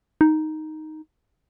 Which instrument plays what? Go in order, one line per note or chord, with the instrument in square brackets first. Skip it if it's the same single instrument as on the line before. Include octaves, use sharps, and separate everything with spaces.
[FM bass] D#4